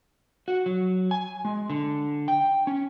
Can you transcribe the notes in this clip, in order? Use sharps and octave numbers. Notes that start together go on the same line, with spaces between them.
F#4
F#3
G#5
G#3
D3
G5
C#4